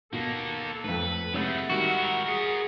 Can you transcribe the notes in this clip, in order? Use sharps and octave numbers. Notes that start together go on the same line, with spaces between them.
B2 D#3 A#3 A4
F2 A2 B4
C3 G#3 A3 E4 C#5 F#5 E6
D#3 G3 G#3 F#4 A#4
G#4 A#4 F#5